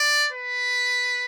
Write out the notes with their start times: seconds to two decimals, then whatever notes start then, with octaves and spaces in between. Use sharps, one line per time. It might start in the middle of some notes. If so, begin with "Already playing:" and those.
Already playing: D5
0.33 B4